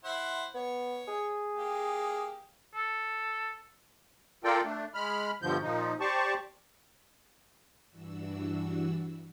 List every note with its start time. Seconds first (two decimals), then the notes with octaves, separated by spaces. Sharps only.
0.04 E4 C5 F#5
0.55 B3 C#5
1.08 G#4
1.55 A#3 G4
2.75 A4
4.44 F4 A4 A#4 D5 G5
4.64 A3 D4
4.94 G#3 B5 F6
5.42 G2 B2 D3 F3 G6
5.63 A#2 F3 D#4
6.00 G4 C5 D5 A5 C#6
7.89 G2 E3 D4 F#4 E6